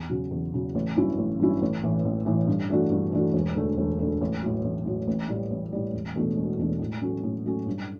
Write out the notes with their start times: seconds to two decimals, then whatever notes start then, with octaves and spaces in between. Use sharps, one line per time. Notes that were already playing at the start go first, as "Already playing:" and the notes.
Already playing: E2
0.10 C#3 F#3
0.31 E2
0.54 C#3 F#3
0.75 A1
0.96 G2 F#3 C#4 E4
1.18 A1
1.40 G2 F#3 C#4 E4
1.62 A1
1.84 A2 E3
2.05 A1
2.26 A2 E3
2.47 G2
2.70 E3 A3 D4 F#4
2.91 G2
3.12 E3 A3 D4 F#4
3.34 E1
3.55 D2 D3 A3
3.78 E1
3.99 D2 D3 A3
4.21 A1
4.42 A2 F#3
4.64 A1
4.86 A2 F#3
5.08 A1
5.28 A2 G3
5.51 A1
5.73 A2 G3
5.93 E1
6.15 E2 B2 A3 D4
6.37 E1
6.58 E2 B2 A3 D4
6.80 A2
7.02 F#3 A3 C#4
7.24 A2
7.46 F#3 A3 C#4
7.66 G2